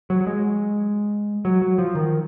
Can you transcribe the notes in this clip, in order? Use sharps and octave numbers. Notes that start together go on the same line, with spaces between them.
F#3
F#3
G#3
F#3
F#3
F3
D#3